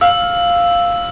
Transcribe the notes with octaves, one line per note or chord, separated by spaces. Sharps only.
F5 E6